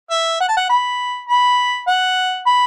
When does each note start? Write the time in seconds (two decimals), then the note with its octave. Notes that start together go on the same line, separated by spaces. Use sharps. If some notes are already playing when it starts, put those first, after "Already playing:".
0.10 E5
0.40 F#5
0.48 A5
0.57 F#5
0.69 B5
1.29 B5
1.87 F#5
2.46 B5